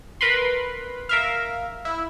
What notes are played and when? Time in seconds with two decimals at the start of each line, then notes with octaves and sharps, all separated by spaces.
0.21 A#4 B4 B5 C6
1.09 A#4 E5 F5
1.85 E4